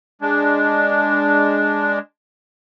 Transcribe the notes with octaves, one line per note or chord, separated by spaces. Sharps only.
G#3 D4